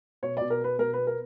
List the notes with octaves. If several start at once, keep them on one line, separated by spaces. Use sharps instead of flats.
B2 C#5
B2 D5
A#4
B3 B4
B2 A#4
B3 B4
A#4